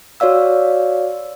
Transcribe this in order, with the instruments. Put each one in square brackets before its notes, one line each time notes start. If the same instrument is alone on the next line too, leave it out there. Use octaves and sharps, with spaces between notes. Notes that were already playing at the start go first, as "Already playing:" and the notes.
[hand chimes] F#4 C#5 D5 F5 E6